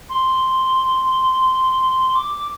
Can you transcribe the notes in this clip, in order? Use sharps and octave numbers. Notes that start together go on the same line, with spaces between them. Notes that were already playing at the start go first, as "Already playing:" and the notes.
C6
D6